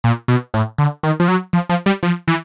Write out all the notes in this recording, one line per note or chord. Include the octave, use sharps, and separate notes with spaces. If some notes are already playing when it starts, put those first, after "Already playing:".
A#2
B2
A2
D3
D#3
F3
F#3
F3
F3
G3
F3
E3